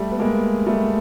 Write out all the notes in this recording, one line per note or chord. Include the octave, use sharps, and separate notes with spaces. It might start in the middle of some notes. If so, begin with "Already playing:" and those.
Already playing: G3 A3
B3
G#3 A#3
G3 A3